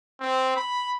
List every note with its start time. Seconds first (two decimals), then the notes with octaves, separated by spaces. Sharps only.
0.21 C4
0.56 B5